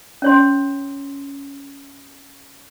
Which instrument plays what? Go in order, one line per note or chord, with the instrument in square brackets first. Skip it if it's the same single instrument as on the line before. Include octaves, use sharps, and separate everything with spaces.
[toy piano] C#4 C#5 C6